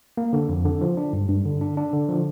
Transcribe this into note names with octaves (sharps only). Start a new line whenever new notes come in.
A#3
D3
F2
D3
F3
D4
G2
G2
D3
D4
D4
D3
F3